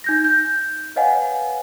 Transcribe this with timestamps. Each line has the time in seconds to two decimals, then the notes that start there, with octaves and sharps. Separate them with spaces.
0.04 D#4 G6 A#6
0.24 G6
0.96 B4 C#5 D#5 F5 F#5 G#5